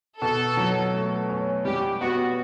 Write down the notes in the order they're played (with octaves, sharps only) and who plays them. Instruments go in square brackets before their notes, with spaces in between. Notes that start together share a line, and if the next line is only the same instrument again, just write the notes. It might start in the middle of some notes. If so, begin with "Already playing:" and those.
[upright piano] B2 [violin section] A4
[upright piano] F#3
A3
C#4
[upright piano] G3 [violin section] G4
[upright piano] B3 [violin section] F#4